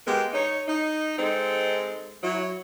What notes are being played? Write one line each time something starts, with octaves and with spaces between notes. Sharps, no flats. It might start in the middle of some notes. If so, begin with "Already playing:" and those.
G#3 A#3 B3 G4
D#4 C#5
D#4
G#3 C4 D#4 A4
F#3 E4